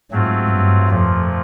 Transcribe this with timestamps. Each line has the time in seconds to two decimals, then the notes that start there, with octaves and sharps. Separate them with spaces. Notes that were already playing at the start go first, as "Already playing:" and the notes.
0.11 G#2 F#3 A3 C4 F4
0.49 G2
0.88 F2 A#2 F3 A3